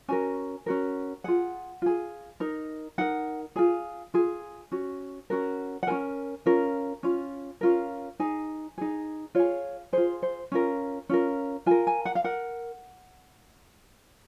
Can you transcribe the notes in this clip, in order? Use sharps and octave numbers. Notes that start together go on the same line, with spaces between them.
C#4 F#4 A#4 G#5
C#4 F#4 A#4
F4 G#4 F#5
F4 G#4
D#4 A#4
D#4 A#4 F#5
F4 G#4 G#5
F4 G#4
C#4 F#4
C#4 F#4 A#4
F#5
C#4 F4 A#4 G#5
C#4 F4 A#4
C#4 F4
C#4 F4 A#4
D#4 G#4 G#5
D#4 G#4
F4 G#4 C#5
F4 G#4 C5
C5
C#4 F4 A#4
C#4 F4 A#4
F4 A#4 G#5
G#5
F#5
F5
A#4 F#5